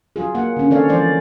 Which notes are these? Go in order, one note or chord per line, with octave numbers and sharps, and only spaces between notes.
F#3 F4 G#4
A#3 F#5
D3 C#4
D#3 C4 A4 C#5 D5 F5
E3 F3 G#3 C5 D5